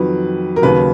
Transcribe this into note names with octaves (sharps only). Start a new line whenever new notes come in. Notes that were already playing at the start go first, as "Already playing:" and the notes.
Already playing: F2 D#3 F#3 B4
A#4
D#2 C#3 F#3 B4